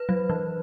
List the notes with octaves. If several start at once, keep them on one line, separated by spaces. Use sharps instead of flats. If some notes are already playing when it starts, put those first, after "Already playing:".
Already playing: B4
F#3
E3